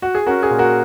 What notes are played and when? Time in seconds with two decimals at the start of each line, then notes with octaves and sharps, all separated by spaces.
0.02 F#4
0.15 G#4
0.26 C#4 F#4 A#4
0.43 G#4
0.50 A#2
0.59 F#4 A#4